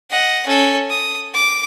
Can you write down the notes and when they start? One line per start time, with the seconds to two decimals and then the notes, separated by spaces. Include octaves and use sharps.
0.10 D#5 F#5
0.46 C#4 A4
0.90 D#6
1.34 D6